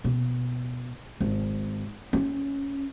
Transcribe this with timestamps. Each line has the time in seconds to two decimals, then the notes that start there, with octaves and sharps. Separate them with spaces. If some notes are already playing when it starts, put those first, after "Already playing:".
0.04 B2
1.21 G#1
2.13 C#4